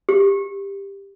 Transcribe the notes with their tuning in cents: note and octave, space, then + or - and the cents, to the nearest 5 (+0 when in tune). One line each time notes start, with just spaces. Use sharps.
G4 +10